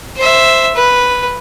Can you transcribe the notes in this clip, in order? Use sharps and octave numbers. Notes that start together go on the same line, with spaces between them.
C5 E5
B4